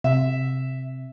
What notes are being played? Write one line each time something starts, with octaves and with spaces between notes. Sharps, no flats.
C3 E5